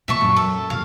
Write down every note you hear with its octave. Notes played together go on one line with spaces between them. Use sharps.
A#2 E3 E5 A5 C#6
F#2
A4
D#2 A#2 F5